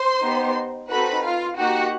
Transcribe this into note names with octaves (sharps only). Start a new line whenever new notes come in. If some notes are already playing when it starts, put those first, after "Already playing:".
Already playing: C5 C6
B3 D#4 G4
C4 D#4 F#4 A4 B4 B5
F4 F5
A#3 D#4 F#4 G4 F#5